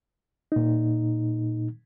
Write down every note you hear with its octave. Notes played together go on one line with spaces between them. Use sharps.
A#2 D#4